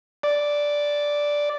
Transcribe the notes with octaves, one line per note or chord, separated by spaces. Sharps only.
D5